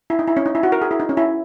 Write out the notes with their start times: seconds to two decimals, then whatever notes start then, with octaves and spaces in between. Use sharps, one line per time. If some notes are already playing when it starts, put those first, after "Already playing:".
0.10 E4
0.19 D#4
0.28 E4
0.37 C#4
0.46 D#4
0.55 E4
0.63 F#4
0.72 A#4
0.82 G#4
0.91 E4
1.00 D#4
1.09 C#4
1.17 E4